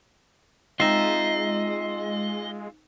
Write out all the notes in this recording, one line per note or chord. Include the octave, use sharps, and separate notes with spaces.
G#3 C4 D#4 F4 D#5 E5